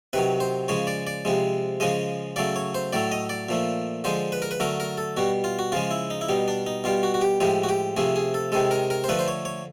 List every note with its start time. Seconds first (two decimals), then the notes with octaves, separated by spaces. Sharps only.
0.13 C3 D#3 F#3 B4
0.40 C5
0.68 C#3 F3 G#3 C#5
0.87 D5
1.07 D5
1.25 C3 F3 G#3
1.80 C#3 F3 G#3 D#5
2.36 C#3 F#3 A3 D5
2.56 C#5
2.75 C5
2.93 A2 F#3 A3 D5
3.12 D#5
3.29 D5
3.49 A#2 F3 A3
4.04 D3 F3 G#3 C5
4.32 B4
4.42 A#4
4.51 B4
4.60 D3 F#3 A3 A#4
4.80 A#4
4.98 A4
5.17 B2 G3 F#4
5.44 F4
5.59 F#4
5.72 C#3 F3 G#3 F4
5.91 E4
6.10 D#4
6.21 E4
6.29 B2 G3 D#4
6.48 D4
6.67 D#4
6.84 B2 G3 F4
7.03 F#4
7.14 F#4
7.21 G4
7.40 A2 F3 G#3 G4
7.64 F#4
7.69 G4
7.97 C3 F3 A3 G#4
8.16 G#4
8.34 A4
8.52 C3 D#3 G#3 A4
8.71 A#4
8.90 A#4
9.04 C5
9.09 D3 F3 A3 B4
9.19 C5
9.28 C#5
9.45 C#5